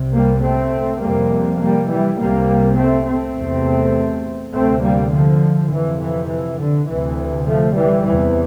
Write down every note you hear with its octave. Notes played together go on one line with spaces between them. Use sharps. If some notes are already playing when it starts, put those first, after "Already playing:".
Already playing: C2 C3
G3 A#3
A3 C4
F2 C3 G3 A#3
G3 A#3
E3 G3
C2 C3 G3 A#3
A3 C4
A3 C4
E2 C3
D2 C3 A3 C4
G3 A#3
D3 F3
F2 C3 E3
E3
E3
D3
D2 C3 E3
F3 A3
E3 G3
E2 C3 E3